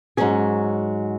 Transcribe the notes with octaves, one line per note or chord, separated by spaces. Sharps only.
G#2 F#3 C#4 G#4